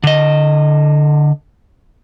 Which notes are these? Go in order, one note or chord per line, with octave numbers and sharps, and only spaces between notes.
D3 D#5